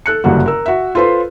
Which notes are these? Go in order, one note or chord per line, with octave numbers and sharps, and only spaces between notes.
A4 F#6 C#7
F#1 G2 D3 A#3 F#4
A#4 E6
F#4 E5
F4 A4 B4 C5 C6